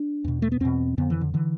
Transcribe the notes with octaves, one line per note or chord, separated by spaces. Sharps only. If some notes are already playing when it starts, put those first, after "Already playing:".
Already playing: D4
E2 B2
A3
B3
E2 B2 C4
F2 D3 B3
E3
D3
D3 E3